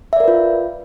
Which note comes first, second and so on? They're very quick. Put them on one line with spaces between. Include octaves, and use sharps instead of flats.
E5 D5 A#4 B4 F4